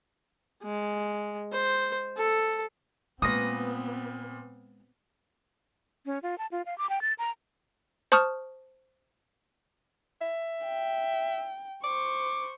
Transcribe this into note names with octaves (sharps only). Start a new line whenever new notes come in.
G#3
C5
A4
A#2 G#3 B3 C4 B4 D#6 A#6
C#4
F4
A5
F4
F5
D6
G5
A6
A#5
C5 A5 C#6 D#6 F6
E5
G5
C5 C#6 D6